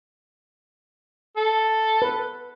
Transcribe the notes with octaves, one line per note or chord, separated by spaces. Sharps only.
A4
B4